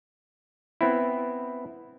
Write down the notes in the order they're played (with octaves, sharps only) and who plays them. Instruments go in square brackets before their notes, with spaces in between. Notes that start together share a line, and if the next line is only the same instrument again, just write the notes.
[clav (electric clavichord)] B3 C4 E4